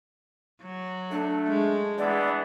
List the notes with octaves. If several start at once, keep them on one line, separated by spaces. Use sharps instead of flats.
F#3
A3 D4
G#3
E3 B3 D4 D5